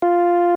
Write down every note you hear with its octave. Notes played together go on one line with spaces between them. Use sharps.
F4